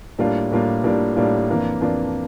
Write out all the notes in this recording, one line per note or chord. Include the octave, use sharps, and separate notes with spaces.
A2 G3 A#3 D4 F4
A2 G3 A#3 D4 F4
A2 G3 A#3 D4 F4
A2 G3 A#3 D4 F4
F2 E3 A#3 D4 F4
F2 E3 A#3 D4 F4